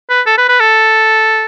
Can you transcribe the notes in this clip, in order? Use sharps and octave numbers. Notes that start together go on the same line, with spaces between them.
B4
A4
B4
B4
A4